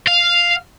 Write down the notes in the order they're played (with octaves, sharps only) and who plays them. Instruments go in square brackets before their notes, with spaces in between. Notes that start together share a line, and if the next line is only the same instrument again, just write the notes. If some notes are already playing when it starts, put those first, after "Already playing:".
[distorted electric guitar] F5